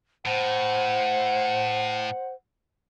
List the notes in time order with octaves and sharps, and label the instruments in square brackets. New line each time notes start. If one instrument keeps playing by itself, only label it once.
[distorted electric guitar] A2 [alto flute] C5 [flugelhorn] F#5